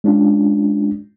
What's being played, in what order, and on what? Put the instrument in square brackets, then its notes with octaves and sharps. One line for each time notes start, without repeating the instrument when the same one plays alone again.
[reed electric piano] G#3 C#4 D4 F4